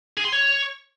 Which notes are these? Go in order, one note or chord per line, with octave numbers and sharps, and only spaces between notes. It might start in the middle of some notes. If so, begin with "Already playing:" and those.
G#4
C6
C#5